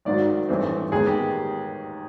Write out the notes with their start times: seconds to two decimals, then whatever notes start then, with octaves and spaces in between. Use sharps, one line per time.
0.05 G#1 G#2 D#3 F#3 D5
0.49 A1 G2 E3 A3 C4
0.92 D#2 D#3 G#3 B3 G#4
1.06 G4